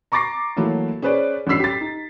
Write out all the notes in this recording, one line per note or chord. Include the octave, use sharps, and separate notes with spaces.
A#5 C#6 D6 A6 A#6 C7
E3 F#3 A3 A#3 E4
C#4 G#4 B4 C5 D5
A1 G2 F#3 E6 B6 C7
G4 A6
D#4